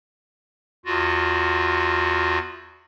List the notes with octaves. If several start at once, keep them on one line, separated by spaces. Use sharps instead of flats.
E2 F4 F#4